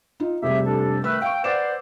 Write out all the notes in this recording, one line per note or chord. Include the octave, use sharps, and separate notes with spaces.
D#4 F4
F1 C3 G3 G4 G#4 E5
D4 G4 A4
D#3 A3 B4 E6
F5 G5 C#6
B4 C5 D5 F#5 D6 E7